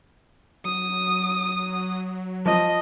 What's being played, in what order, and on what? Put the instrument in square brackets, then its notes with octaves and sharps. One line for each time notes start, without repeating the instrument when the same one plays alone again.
[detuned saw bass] F#3 [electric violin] D#6
[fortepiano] F3 [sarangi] D#5